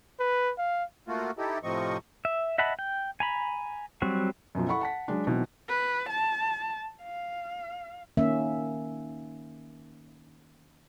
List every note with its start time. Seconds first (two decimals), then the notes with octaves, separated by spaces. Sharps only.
0.20 B4
0.58 F5
1.08 A3 A#3 F4 F#4
1.38 D#4 E4 G4 A4
1.63 A2 C3 F3 C4 D#5 C#6
2.25 E5
2.58 D#5 E5 F#5 A5 B5
2.79 G5
3.20 G#5 A#5 B5
4.02 F#3 G3 C4 F#4
4.55 F#2 B2 F3
4.67 E4 A4 F#5 B5 C#6
4.81 F#5 A5 B6
5.08 F#3 G#3 D4
5.27 B2 D#3 E3 F#3 C4
5.68 B4
6.10 A5
7.04 F5
8.17 D#3 A#3 C#4 E5